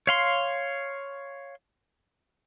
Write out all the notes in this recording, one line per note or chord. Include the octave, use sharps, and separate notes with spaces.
C#5 F5 C6